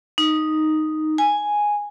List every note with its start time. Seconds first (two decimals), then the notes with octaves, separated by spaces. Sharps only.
0.18 D#4
1.18 G#5